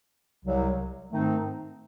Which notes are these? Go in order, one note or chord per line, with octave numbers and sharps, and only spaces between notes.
C2 C3 F#3
G#2 D#3 A3 C4 D#4